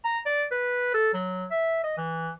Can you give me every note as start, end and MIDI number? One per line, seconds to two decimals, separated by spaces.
0.05 0.19 82
0.26 0.44 74
0.51 0.94 71
0.94 1.13 69
1.14 1.46 54
1.51 1.83 76
1.84 1.97 75
1.98 2.31 52